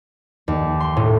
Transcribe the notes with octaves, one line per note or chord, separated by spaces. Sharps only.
D#2
C6
A2